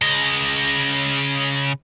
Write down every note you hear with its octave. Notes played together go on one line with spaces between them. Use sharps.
C#3 D#5